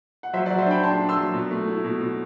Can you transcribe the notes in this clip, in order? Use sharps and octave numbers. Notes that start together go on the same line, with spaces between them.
F#5
F#3 C5 E5
D5 F#5
F#3
C5 E5
D4 G5 B5
D4 A5 C6
D4
C6 E6
F#3
B2
A3
E4
B2
B2